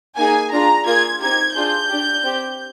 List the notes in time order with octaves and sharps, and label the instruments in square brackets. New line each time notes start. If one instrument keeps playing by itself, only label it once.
[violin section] A#3 D#4 G#4 G#5
D4 F4 G#4 A#5
A#3 F4 G#4 G#6
C4 D#4 G4 G#6
D4 F4 G#4 G6
D4 G4
C4 G4